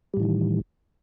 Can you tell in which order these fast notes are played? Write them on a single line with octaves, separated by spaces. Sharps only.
G3 A2 E3 D#3